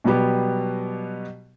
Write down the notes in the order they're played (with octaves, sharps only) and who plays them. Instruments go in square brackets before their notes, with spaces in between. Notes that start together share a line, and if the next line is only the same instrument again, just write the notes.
[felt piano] B2 F#3 G3 B3 G4